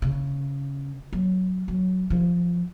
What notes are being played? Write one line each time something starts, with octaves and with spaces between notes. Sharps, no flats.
C#3
F#3
F#3
F3